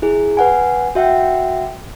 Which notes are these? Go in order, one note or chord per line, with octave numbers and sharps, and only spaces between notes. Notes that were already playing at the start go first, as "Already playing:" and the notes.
E4 G#4
B4 F#5 G#5
F#4 E5 F#5 G5